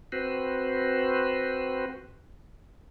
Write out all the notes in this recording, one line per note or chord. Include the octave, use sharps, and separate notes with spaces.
C4 F#4 B4 C5